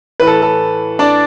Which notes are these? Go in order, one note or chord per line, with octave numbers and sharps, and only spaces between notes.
A2 E3 B4
A4
A4
D4 D5